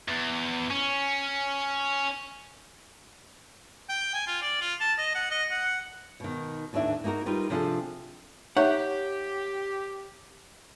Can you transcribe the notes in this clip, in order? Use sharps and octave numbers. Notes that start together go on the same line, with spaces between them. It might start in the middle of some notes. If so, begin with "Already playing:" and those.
E2
C#4
G5
G#5
F4
D5
F4
A5
D#5
F#5
D#5
F#5
B2 D#3
D#2 A2 E3 D4 E5
A#3 D#4 F#4 G#4 A#4
G3 D#4 F4 G4 A#4 B4
C3 F3 D4 F4 G#4 A4
D#4 G4 C#5 E5 F#5 C#6